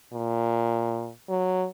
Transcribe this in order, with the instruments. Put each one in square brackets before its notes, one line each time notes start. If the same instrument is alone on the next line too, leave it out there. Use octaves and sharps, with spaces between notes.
[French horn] A#2
F#3